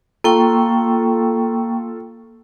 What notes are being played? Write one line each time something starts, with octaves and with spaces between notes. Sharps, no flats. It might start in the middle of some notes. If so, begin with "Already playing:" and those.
A#3 F4 A4 G5 C#6